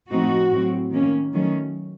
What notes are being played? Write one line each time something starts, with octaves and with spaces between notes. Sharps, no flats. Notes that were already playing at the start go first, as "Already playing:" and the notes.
A2 F3 A3 C4 D#4 F#4
A2 F#3 C4
D#3 A#3 C#4
D#3 F#3 A3 C#4